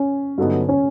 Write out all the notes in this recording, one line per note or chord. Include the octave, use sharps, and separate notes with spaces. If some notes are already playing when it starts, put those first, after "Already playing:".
Already playing: C#4
G2 D3 F#3 B3 D#4
C#4